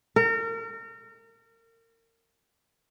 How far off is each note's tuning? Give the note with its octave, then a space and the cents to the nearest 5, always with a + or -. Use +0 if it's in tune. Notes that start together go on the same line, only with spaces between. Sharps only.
A#4 -35